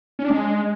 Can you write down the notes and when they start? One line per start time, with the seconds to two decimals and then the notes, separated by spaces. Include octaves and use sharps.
0.19 C#4
0.24 D4
0.30 G#3